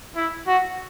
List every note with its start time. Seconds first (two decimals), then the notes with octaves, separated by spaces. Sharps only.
0.16 E4
0.47 F#4